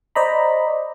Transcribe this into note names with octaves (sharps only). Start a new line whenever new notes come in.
C5 D5 D#5 A#5 B5